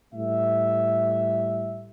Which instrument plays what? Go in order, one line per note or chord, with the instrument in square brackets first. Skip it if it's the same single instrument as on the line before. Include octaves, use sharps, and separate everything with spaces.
[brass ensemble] A2 G3 E5